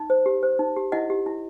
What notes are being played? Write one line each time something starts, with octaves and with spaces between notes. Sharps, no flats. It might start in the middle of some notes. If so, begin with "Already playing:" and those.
Already playing: D#4
C5
G4
C5
D#4
G4
E4 D#5 F#5
G4
E4